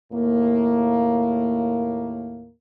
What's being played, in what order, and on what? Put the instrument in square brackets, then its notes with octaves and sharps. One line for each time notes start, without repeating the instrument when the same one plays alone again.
[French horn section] D#2 A2 A#3